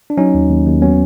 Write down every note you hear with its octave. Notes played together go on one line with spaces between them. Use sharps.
D4
F#3 C#4 D#4
D#2
D#2
D#2
F#3 B3 C#4